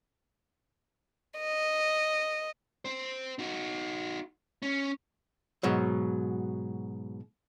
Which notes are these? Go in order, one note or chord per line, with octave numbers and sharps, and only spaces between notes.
D#5
C4 C5
D#4 F#4
C#4
G#2 B2 F#3